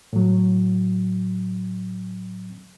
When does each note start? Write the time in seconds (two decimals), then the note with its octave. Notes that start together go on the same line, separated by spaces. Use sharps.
0.13 A2 F#3